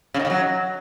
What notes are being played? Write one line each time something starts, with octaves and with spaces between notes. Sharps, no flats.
C#3
D#3
C#3
F#3